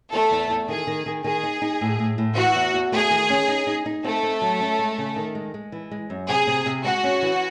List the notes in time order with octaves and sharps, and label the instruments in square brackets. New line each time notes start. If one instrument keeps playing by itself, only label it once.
[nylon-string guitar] E2 [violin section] A3 A4
[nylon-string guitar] E2
E2
[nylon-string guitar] D#3 [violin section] G#4
[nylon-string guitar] D#3
D#3
[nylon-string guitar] D#3 [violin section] G#4
[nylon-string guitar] D#4
D#4
A2
A2
A2
[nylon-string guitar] E3 [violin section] F#4
[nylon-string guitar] E2
E2
[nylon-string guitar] A3 [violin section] G#4
[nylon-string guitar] D#3
C#4
D#4
D#4
D#4
[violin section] A3 A4 [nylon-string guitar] C4
[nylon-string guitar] C4
F#3
C#4
G#3
C#3
D#3
G#3
G#3
E3
G#3
F#2
[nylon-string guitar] C3 [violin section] G#4
[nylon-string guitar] C3
C3
[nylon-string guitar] G#3 [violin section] F#4
[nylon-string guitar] C#4
E3